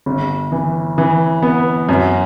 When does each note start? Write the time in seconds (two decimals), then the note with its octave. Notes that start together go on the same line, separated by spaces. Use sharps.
0.06 G1
0.52 E3
0.98 E3
1.42 B3
1.89 F#2